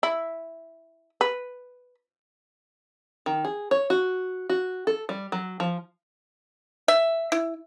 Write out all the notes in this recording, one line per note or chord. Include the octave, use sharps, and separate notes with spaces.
E4
B4
D#3
G#4
C#5
F#4
F#4
A4
G3
F#3
F3
E5
E4